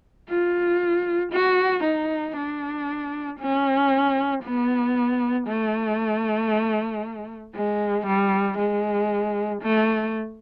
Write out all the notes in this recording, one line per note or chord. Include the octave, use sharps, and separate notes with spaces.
F4
F#4
D#4
D4
C#4
B3
A3
G#3
G3
G#3
A3